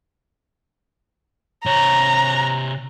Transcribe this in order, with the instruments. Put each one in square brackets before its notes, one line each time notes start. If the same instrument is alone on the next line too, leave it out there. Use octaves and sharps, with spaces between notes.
[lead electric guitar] C3 C#5 [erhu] A#5